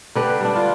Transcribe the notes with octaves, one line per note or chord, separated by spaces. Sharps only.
D3 G4 B4
G3 D4
F4